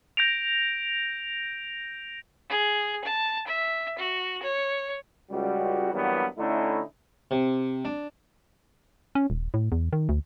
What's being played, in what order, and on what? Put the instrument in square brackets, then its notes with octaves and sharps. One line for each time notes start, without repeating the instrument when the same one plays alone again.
[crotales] G6 A#6 D7 F7
[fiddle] G#4
A5
E5
F#4
C#5
[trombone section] C#2 G3 F#4
G2 E3 F#3 G3 A#3 B3
D3 A3 C#4 D#4 E4
[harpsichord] C3
D4
[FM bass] C#4
D#1
A2
E2
D#3
D2